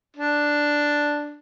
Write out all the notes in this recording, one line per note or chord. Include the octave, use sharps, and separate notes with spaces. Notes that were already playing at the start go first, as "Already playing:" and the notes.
D4